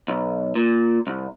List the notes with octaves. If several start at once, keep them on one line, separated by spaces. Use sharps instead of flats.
B1
A#2
C2